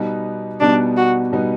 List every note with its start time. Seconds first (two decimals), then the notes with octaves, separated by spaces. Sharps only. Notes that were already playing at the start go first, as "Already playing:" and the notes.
Already playing: B2 G3 B3 D#4
0.60 B2 G3 B3 D4 D#4
0.97 F#4
1.33 B2 G3 B3 D#4